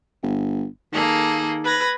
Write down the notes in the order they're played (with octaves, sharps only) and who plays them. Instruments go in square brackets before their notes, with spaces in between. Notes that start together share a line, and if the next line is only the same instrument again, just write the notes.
[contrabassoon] G1
[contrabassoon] D#3 [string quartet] A#3 G#4 A4
[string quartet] B4 G#6 A#6